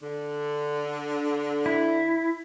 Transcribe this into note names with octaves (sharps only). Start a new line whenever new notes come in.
D3
E4